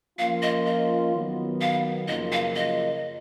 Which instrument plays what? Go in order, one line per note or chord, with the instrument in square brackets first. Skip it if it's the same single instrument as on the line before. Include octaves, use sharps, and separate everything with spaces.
[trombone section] F3 A#3 C#4 F4 [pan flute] F5
[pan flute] D#5
D#5
[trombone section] D#3 F#3 B3
[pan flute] F5
[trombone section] F#2 C#3 F3 A#3 F4 [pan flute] D#5
[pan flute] F5
D#5